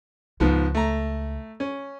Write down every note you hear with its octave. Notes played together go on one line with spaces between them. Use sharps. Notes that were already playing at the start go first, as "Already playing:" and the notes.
C#2 G#2 F3 B3
A3 A#5
C#4